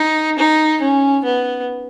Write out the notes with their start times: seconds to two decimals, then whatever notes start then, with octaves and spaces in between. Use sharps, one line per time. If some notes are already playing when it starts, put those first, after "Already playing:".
Already playing: D#4
0.38 D#4
0.81 C#4
1.24 B3